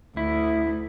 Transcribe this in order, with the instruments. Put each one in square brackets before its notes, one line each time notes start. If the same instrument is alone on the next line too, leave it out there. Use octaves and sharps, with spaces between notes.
[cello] D2 [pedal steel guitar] E4